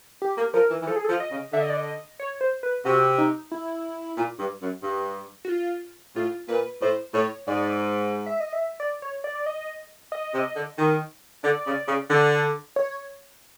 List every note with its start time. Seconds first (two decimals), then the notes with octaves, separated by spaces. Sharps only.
0.22 G4
0.38 A#3
0.54 F3 A#4
0.70 E3
0.82 E3
0.87 F3 A4
0.96 G#4
1.04 A4
1.10 F3
1.20 D#5
1.31 C#3
1.53 D3 E5
1.61 D#5
1.70 D5
1.77 D#5
2.19 C#5
2.41 C5
2.63 B4
2.85 C3 F#4
3.18 D#4
3.51 E4
4.18 A#2
4.39 G2
4.62 F#2
4.83 G2
5.45 F#4
5.49 F4
6.16 A2 F4
6.48 A#2 B4
6.82 A2 C5
7.14 A2 C#5
7.48 G#2 D5
8.26 E5
8.40 D#5
8.53 E5
8.80 D5
9.02 C#5
9.24 D5
9.35 D5
9.46 D#5
10.12 D#5
10.34 C3
10.56 D3
10.78 D#3
11.44 D3 D5
11.66 C#3
11.88 C#3
12.10 D3
12.76 C#5